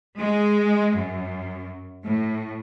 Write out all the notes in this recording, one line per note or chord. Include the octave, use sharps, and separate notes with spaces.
G#3
F#2
A2